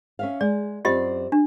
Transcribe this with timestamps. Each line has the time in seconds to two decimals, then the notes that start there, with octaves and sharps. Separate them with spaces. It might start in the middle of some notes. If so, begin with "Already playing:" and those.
0.19 C#4 E5 F5
0.41 G#3 D5
0.85 F#2 C4 F4 G4 D5 D#5
1.32 D4